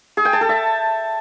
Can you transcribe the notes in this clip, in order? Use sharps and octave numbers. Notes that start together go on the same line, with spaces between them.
G#4
G5
A5
A4
E5